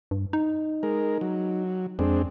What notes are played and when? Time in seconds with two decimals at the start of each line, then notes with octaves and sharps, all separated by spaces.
0.11 G2
0.33 D#4
0.83 G#3 A#4
1.21 F#3
1.99 F2 G#3 C4 D4